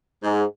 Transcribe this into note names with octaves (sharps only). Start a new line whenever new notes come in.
G#2